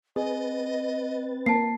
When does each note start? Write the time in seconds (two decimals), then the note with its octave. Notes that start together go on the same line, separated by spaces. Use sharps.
0.16 C4 G#4 B4 D#5 A6
1.46 A#3 A5 C7